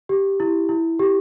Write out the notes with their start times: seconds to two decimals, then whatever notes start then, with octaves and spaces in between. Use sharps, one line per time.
0.09 G4
0.40 E4
0.69 E4
0.99 G4